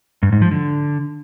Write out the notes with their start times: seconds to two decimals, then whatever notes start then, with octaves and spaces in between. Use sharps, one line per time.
0.23 G2
0.32 G#2
0.42 F3
0.51 D3